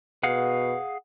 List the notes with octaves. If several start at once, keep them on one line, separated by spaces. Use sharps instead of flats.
B2 G#4 F5 F#5